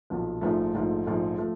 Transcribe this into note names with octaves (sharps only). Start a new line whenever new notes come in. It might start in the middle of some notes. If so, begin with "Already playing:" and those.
B1 A#2 F3
A#1 G#2 F3 A3
A#1 G#2 F3 A3
A#1 G#2 F3 A3
F3 A3